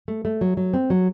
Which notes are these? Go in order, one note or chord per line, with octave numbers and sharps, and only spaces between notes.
A3
A3
F#3
F#3
C4
F#3